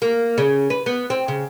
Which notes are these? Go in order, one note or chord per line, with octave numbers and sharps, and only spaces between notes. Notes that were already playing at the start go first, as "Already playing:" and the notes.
A#3
C#3
B4
B3
C4
C#3